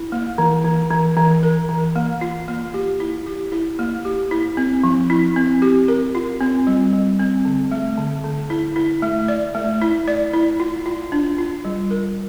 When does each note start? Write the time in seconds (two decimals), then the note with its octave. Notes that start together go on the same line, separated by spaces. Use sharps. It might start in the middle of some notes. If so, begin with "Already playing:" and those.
Already playing: E4
0.12 A#3
0.38 E3
0.64 E3
0.90 E3
1.17 E3
1.43 A#4
1.69 E3
1.96 A#3
2.21 F4
2.48 A#3
2.74 G4
3.00 E4
3.27 G4
3.52 E4
3.79 A#3
4.05 G4
4.31 E4
4.57 C4
4.84 F3
5.10 E4
5.36 C4
5.62 G4
5.88 A#4
6.15 F4
6.41 C4
6.67 G3
6.93 G3
7.19 C4
7.45 D3
7.72 A3
7.97 D3
8.24 D3
8.50 E4
8.76 E4
9.02 A3
9.28 D5
9.55 A3
9.82 E4
10.08 D5
10.33 E4
10.60 F4
10.86 F4
11.12 D4
11.38 F4
11.65 G3
11.91 A#4